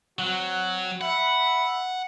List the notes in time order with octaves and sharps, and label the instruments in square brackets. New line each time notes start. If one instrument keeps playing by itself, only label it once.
[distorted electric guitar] F#3 [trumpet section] C4 F#4 F#5
[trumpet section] E5 B5 [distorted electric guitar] F#5